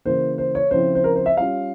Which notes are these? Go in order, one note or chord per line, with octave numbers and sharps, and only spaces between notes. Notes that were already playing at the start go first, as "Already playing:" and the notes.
C#3 E3 A#3 C5
C5
C#5
C#3 F3 C4 E4 C5
C5
A#4
C5
E5
G3 C#4 F4 F5